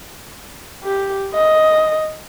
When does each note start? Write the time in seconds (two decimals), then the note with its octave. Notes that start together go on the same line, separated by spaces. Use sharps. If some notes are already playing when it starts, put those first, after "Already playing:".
0.83 G4
1.34 D#5